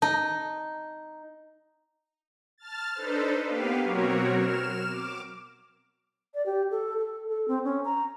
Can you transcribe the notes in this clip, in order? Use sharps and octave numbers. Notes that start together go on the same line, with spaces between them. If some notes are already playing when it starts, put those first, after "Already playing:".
D#4 A5
A5 F6 A6
D4 D#4 A4 B4 C5
A#3 B3 G4 B4 F5
B2 F#3 C4 F#4 A#4 C#5
F6 E7
D6
D5
G4
A4
A4
A4
C4
C#4
A#5